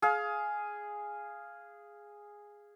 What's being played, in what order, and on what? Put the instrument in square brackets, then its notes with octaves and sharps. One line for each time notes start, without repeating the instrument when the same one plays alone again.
[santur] G#4 F5